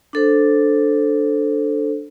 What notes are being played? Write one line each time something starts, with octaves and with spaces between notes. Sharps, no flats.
D4 A4 C5